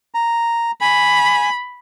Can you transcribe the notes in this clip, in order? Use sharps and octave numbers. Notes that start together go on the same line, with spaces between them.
A#5
G#5 B5